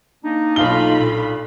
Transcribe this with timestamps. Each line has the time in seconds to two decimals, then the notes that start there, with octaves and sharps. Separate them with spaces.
0.24 A#3 D4 D#4
0.56 B1 F4 A4 F5 B5 G7
1.00 A#2